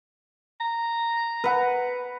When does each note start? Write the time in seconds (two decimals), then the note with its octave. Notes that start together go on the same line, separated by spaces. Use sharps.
0.60 A#5
1.44 B4 F#5